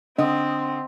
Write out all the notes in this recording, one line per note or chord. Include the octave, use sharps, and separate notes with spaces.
D3 C4 D#5 D#6